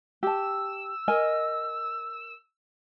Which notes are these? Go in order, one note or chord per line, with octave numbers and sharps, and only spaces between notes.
G4 A5 E6
A#4 D#5 G#5